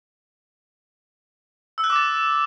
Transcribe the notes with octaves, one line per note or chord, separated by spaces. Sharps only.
E6
F#6
D6
A6